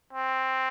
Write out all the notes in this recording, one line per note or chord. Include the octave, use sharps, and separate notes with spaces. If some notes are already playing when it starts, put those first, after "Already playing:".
C4